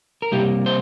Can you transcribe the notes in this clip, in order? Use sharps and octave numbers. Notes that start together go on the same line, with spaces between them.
A#4
C3 G3 A#3 G4
C5